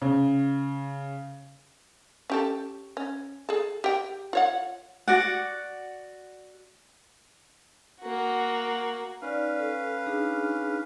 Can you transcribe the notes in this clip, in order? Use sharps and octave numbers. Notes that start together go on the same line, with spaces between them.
C#3
C#4 G4 A4
C#4
G#4 A4
G4 G5
F4 C#5 F#5
F#4 D5 F#5
A#3 F#4
C#4 D#4 B4 D5 F5
A4
D4 D#4 G#4